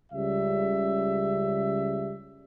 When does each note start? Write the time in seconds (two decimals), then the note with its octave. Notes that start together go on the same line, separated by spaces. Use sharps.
0.13 C#2 C#3 G3 E5